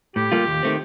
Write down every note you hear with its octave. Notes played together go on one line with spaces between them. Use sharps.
A2 G4
G3 A#3 F4 A4
D#2
D#3 A3 C4